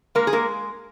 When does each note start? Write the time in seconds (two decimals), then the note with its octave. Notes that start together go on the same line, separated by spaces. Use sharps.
0.15 G#3 A#3 A#4
0.27 G#4
0.33 G#3 A#3 A#4